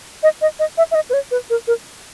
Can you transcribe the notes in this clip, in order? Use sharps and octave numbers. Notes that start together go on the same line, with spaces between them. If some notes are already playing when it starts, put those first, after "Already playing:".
D#5
D#5
D#5
E5
E5
D#5
B4
C#5
B4
A#4
A#4